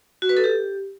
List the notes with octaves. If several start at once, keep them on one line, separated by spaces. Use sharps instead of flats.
F#4
B4
A4
G4